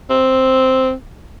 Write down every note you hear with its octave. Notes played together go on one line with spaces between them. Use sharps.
C4